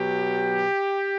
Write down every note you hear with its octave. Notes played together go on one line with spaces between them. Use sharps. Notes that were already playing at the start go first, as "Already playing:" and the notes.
Already playing: B2 F#3 G4